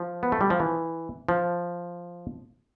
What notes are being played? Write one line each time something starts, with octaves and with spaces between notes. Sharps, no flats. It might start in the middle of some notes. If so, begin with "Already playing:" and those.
Already playing: F3
B3
A3
G3
F3
E3
F3